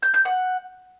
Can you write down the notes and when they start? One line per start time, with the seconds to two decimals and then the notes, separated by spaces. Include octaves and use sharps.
0.02 G6
0.14 G6
0.25 F#5